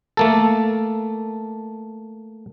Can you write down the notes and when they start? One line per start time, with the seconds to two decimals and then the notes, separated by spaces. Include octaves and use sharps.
0.17 A3 A#3 A4